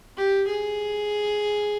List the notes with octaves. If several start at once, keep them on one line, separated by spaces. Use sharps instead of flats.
G4
G#4